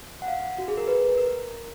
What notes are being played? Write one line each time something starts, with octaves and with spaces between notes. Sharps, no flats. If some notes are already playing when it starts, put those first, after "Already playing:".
F#5
F5
F#4
G#4
A#4
B4
A#4